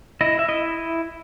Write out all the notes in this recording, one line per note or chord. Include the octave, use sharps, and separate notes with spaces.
E4 D#5
E5
E4 D#5